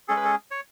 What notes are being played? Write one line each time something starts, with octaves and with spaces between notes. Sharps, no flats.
G#3 C#4 G#4 A4
B4
A4
C#5